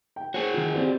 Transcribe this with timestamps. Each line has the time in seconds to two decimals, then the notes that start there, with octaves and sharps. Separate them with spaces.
0.16 G5
0.34 F#4 G#4 C5 C#5
0.54 D#3 F4
0.74 C4 F4 G4 D5